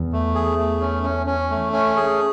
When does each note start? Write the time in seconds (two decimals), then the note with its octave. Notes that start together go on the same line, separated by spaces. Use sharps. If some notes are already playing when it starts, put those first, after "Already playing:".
Already playing: E2
0.13 A3
0.35 G#4
0.58 A3
0.81 C#4
1.04 C#4
1.27 C#4
1.50 A3
1.73 C#4
1.96 G#4